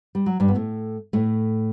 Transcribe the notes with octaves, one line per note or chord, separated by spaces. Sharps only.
G3
F#3
G2 G3
B3
A2 A3
A2 A3